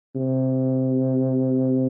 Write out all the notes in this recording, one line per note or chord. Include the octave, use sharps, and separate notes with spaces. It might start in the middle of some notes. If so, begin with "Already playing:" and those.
C3